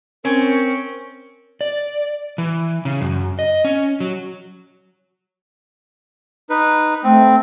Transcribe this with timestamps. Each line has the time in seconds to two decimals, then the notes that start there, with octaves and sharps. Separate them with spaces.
0.25 C4 C#4 A#4
1.61 D5
2.38 E3
2.85 C#3
3.01 F#2
3.39 D#5
3.65 C#4
4.00 F#3
6.50 D#4 B4
7.04 A3 C4